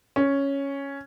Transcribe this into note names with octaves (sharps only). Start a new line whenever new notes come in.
C#4